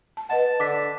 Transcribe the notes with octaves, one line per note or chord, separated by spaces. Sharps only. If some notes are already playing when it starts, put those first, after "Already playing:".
A5
B4 D#5 F#5 A5
D3 D6 B6